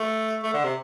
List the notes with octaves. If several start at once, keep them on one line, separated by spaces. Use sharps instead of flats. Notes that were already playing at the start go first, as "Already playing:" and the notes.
Already playing: A3
A3
D3
C3